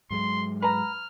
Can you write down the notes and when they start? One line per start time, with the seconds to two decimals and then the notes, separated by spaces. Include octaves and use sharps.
0.10 G#2 F#3 G#3 C6
0.62 B4 A#5 F6